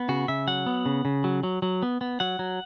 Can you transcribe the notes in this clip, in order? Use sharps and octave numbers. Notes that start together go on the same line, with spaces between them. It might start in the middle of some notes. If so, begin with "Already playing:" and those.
Already playing: B3
C#3 F#4
C#3 E5
F#3 F#5
B3
C#3
C#3
F#3
F#3
F#3
B3
B3
F#3 F#5
F#3